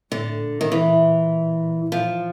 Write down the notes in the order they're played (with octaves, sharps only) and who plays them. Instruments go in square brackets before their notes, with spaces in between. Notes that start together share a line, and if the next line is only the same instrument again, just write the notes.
[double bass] A2 [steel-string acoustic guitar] D3
[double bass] A#2
[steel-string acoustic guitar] D#3
E3
[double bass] A#2 [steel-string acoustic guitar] F3